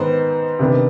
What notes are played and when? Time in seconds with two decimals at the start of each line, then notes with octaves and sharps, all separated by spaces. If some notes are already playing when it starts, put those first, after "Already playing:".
Already playing: G#2 D#3 B3 D#4 C5
0.59 C3 D#3 B3 D4